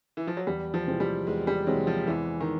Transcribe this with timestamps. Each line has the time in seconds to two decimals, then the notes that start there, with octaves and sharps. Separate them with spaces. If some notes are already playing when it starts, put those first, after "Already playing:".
0.17 E3
0.27 F3
0.37 F#3
0.47 E2 G3
0.74 F3
0.87 C3 E3 G#3 C4
1.00 G3
1.27 E2 G#3
1.47 G3
1.67 C3 E3 F#3 G#3 C4
1.87 F3
2.07 E2 E3
2.40 D#3